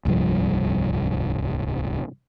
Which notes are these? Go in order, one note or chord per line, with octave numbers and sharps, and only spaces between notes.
D1 C2 G2 F3